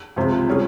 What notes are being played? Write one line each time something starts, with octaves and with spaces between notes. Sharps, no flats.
C#2 C3 F3 G#3
G3 C#4 F4 G#4